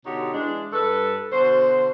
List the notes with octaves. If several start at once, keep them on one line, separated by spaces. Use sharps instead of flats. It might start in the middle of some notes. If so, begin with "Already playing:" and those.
B2 D3 D#4 F#4 G4 C#5
E3 G#3 D4
G2 A4 B4
B2 D3 F#4 C5